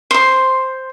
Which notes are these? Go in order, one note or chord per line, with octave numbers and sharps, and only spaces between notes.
C5 C6